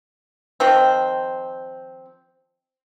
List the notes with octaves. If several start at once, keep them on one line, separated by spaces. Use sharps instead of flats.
D#3 F3 C4